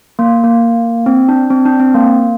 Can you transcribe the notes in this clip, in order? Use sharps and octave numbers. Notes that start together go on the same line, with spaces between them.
A#3
A#3
C4
D4
C4
D4
C4
A#3